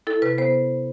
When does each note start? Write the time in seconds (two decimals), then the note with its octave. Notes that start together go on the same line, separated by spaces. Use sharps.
0.07 E4 A4
0.22 C3 B4
0.38 B3 C5